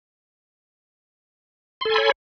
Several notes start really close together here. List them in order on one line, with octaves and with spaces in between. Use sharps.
C6 A4 G#5 B5 C#5